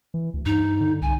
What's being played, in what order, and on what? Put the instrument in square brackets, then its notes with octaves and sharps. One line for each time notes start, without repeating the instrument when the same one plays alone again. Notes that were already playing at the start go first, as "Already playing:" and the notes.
[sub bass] E3
D2
[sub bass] G2 [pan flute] D#4
[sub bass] D3
[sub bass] C2 [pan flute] G#5